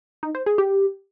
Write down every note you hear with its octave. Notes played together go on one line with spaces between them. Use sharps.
D#4
C5
G#4
G4